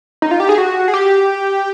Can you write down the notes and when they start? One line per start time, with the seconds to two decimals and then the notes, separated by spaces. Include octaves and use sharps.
0.22 D#4
0.31 F4
0.40 G4
0.49 G#4
0.58 F#4
0.88 G#4
0.94 G4